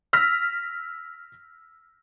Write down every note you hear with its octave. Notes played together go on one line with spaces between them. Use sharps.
E6 F6 A#6 B6